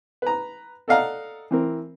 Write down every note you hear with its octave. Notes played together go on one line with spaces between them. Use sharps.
B4 A#5
A4 D5 D#5 F5 F#5 A#5
E3 C4 A#4